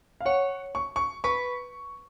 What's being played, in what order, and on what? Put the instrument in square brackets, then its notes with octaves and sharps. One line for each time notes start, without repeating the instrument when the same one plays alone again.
[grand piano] F5
[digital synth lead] C#5 [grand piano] F#5
[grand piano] C#6
C#6
[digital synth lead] B4 [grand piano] C#6